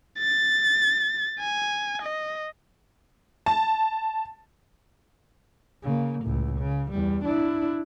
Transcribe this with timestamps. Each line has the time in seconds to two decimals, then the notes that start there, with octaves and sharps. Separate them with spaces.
0.19 A6
1.40 G#5
2.02 D#5
3.46 A5
5.83 C#3 A#3
6.24 C#2 A2
6.59 C#3
6.91 E2 G3
7.24 D4 E4